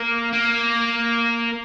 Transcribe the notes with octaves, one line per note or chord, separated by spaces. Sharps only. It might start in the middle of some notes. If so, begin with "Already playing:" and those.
Already playing: A#3
A#3